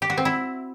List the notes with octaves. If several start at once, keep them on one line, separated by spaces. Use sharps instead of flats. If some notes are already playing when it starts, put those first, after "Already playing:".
G4
F#4
C4
E4